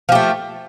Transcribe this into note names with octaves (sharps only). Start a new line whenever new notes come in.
F3 A3 G4